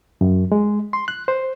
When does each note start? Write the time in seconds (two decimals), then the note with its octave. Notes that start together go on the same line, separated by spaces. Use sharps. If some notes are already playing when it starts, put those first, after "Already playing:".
0.21 F#2
0.52 G#3
0.93 C6
1.08 F#6
1.28 C5